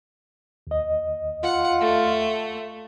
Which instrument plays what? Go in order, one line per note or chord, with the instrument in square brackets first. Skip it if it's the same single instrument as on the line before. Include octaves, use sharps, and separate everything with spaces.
[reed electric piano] D#2 D#5
[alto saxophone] F4 [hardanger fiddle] F#5
[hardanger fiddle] A3